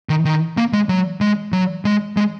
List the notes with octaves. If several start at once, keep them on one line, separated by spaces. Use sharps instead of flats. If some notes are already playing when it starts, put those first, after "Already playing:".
D#3
D#3
A#3
G#3
F#3
G#3
F#3
G#3
G#3